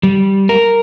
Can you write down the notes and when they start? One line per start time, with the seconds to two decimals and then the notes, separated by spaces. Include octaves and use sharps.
0.03 G3
0.49 A#4